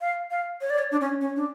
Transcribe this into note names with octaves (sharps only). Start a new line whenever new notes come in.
F5
F5
C#5
D5
C#5
D4
C#4
C#4
D4